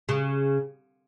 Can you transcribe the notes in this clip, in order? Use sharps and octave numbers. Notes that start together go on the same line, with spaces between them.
C#3